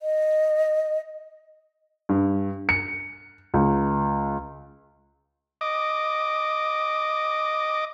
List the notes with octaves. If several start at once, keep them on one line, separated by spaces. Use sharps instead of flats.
D#5
G2
C#7
C#2
D#5 D6